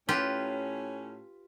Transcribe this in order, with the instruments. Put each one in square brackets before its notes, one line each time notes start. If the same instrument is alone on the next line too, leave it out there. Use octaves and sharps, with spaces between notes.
[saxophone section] A2 C#4 [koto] F4 G4 B4